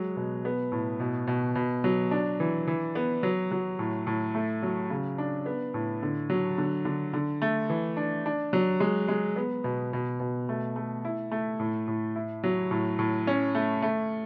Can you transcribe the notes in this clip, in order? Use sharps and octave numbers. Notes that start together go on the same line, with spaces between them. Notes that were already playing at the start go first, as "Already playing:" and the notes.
Already playing: F#3 G#3
B2
B3
A2
B2
B2
B2
F#3
D4
E3
E3
B3
F#3
F#3
A2
A2
A3
F#3
C#3
D4
B3
A2
D3
F#3
D3
D3
D3
A3
E3
D4
D4
F#3
G#3
G#3
B3
B2
B2
B2
A3
A3
E4
A3
A2
A2
E4
F#3
A2
A2
C#4
A3
A3